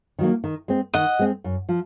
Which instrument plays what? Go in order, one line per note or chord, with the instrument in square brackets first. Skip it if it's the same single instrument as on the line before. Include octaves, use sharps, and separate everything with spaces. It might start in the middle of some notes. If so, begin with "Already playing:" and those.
[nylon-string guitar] D#3 F#3 A#3
D#3
G#3 C4
[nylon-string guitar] D#3 [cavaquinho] D#5 F#5
[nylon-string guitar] G#3 C4
F#2
F3